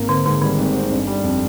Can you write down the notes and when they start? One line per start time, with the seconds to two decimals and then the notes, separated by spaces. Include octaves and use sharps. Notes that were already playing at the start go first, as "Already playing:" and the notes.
Already playing: G#1 A#3
0.09 D3 C4
0.26 G#2 D3
0.42 D#3 G3
0.58 G#1
0.75 C4
0.91 G1
1.07 G3
1.23 F2